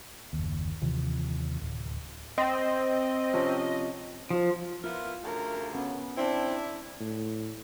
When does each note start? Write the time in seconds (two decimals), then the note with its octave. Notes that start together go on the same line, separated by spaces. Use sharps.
0.33 F#1 D#2
0.82 D#2 C3 E3 F3
1.62 D1
2.38 C4 D#5
3.33 C3 F3 C#4
4.30 F3
4.84 B3 E4 F4 A#4
5.24 D2 C#3 A3 A#4
5.75 B3 C#4
6.17 C4 D4 E4
7.00 A2